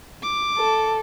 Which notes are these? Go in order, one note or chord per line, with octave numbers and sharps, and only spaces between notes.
D6
A4